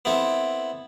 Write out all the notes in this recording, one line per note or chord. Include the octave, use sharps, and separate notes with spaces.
B3 C4 E4 A4